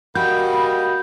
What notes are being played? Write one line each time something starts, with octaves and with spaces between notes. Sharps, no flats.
G3 A#3 F#4 D#5 B5 G6